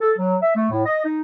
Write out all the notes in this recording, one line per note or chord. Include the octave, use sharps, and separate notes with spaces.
A4
F#3
E5
A3
A2
D#5
D#4